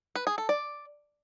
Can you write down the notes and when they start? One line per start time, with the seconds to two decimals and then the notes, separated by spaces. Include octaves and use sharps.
0.15 B4
0.27 G#4
0.38 A4
0.49 D5